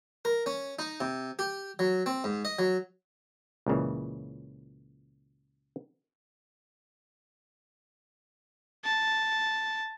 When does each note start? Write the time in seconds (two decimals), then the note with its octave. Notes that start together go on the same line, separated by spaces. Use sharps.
0.25 A#4
0.46 C#4
0.79 D#4
1.01 C3
1.39 G4
1.79 F#3
2.06 C4
2.24 G#2
2.45 D#5
2.59 F#3
3.66 C#2 A#2 C#3 E3
8.84 A5